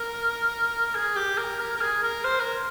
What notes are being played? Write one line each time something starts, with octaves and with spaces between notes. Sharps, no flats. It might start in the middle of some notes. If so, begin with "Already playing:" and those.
Already playing: A#4
G#4
G4
A#4
A#4
A#4
G#4
A#4
C5
A#4